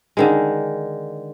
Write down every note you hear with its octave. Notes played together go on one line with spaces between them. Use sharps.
D3 D#3 G#3